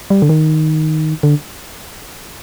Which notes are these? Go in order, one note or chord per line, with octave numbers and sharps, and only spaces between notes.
G3
D3
D#3
D3